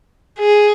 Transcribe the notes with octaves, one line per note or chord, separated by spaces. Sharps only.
G#4